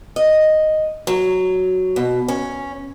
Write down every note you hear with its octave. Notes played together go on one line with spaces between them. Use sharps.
D#5
F#3
B2
C#4